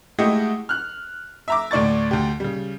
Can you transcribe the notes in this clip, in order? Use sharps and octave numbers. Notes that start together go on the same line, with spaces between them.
G#3 A3 E4 F#4 G4 D#5
F6 F#6
E5 A#5 D6
D2 A2 D5 C#6 A6
D2 G4
C#3 G3